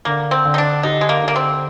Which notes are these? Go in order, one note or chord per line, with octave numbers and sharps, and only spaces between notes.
D3 A#3
C4
D3
D#4
D4
D#4 G4
G#3
A#3
D3
A#3
C4